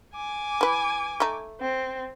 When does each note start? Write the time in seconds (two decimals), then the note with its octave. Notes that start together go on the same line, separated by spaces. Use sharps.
0.15 G#5 D6
0.61 E3 B4
1.20 A3 D#4
1.61 C4